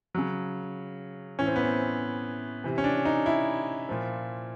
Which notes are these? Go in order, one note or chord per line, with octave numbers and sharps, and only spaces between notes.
C#3 F#3
A2 E3 C#4
C4
B3
C4
C3 E3
C#4
D4
D#4
E4
A#2 F3